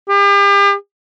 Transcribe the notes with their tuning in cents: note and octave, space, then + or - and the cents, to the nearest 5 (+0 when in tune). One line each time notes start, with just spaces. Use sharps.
G4 +40